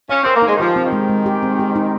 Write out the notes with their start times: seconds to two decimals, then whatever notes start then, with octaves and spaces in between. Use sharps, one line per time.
0.09 C#4 F5
0.23 C4 A#4
0.35 A#3
0.42 G#3 D#4
0.55 D#3
0.60 F3 G4
0.76 C4
0.85 D#3
0.93 G#3
1.09 G#3
1.26 G4
1.43 C4
1.59 G4
1.76 D#4